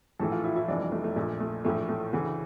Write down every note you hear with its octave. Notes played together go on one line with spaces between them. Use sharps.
A#1 A2 E3 A4
F4
E4
E4
F1 F2 E3 D4
G3
A3
A3
A#1 A#2 A3
A3
A#1 A2 E3 A3
A3
D2 C#3 E3 A3